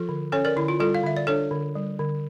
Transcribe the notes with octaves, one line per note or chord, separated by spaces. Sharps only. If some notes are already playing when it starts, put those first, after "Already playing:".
Already playing: F3 F4 A4
D3
C#4 A4 C#5
A#4 D5
D3 E4
F4
G3 F4 A4
F5
D3 E5
D5
D4 A4 C#5
D3
G3
D3